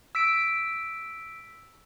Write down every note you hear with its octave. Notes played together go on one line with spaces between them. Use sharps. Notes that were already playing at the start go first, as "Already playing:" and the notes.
E6 B6 D7